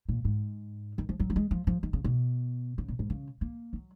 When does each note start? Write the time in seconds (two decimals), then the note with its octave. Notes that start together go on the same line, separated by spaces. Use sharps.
0.09 A#2
0.25 G#2
0.98 D#3
1.09 F3
1.20 F#3
1.30 A#3
1.36 G#3
1.51 F3
1.67 F3
1.83 D#3
1.93 C#3
2.04 B2
2.78 C#3
2.88 A#2
2.99 G#2
3.10 C#3
3.41 A#3
3.73 F#3